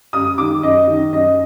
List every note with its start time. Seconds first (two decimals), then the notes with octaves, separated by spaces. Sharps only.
0.13 F#2 D#6
0.38 D#3 D6
0.63 F#2 D#5
0.88 D#3
1.13 F#2 D#5